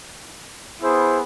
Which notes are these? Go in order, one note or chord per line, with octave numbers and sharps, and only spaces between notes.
B3 E4 G#4 C5